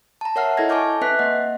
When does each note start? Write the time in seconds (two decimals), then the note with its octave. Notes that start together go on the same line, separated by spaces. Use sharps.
0.21 A5 A#5
0.36 A#4 C#5 E5 F#5 A#5 F6
0.57 E4 A4 D#5 F6 G#6 A#6
0.69 G#5 A5 C#6 D6 F6 G6
1.01 C4 B4 E5 F#6 B6
1.19 A#3 D#5 F#5